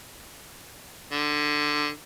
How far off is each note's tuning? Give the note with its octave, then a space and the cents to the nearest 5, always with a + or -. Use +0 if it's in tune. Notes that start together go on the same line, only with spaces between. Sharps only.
D3 +15